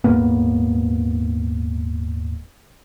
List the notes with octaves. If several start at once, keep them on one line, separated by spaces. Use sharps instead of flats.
D#1 G#2 A#3 B3